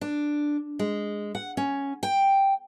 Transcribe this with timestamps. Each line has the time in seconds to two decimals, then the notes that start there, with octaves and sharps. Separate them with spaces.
0.01 D4
0.79 G#3
1.35 F#5
1.57 C#4
2.03 G5